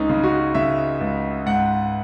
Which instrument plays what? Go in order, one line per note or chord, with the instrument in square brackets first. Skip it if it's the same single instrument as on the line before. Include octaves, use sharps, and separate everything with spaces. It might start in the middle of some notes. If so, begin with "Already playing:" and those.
Already playing: [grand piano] C#2 C#4 D#4
C#3
F#4
C#3 E5
C#2
G#2 F#5